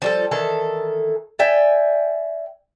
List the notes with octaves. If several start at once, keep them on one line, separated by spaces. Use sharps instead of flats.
F3 G3 A4
D#3 E3 A4
D5 E5 G5 G#5